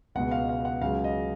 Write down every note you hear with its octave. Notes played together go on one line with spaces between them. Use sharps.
C#2 B2 G#3 B3 F#5
F5
F5
F#5
C#2 C#3 F#3 F5
D#5